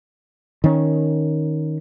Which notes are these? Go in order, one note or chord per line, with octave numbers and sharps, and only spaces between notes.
D#3 C#4